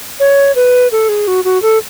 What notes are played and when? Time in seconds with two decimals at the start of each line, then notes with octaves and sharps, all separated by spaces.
0.20 C#5
0.56 B4
0.92 A4
1.09 G#4
1.27 F#4
1.45 F#4
1.62 A4